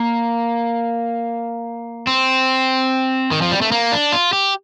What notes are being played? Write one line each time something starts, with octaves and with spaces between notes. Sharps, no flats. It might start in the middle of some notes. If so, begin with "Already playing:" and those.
Already playing: A#3
C4
D#3
F3
G3
A3
A#3
D4
F4
G4